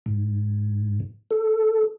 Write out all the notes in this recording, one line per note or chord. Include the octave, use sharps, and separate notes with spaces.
G#2
A4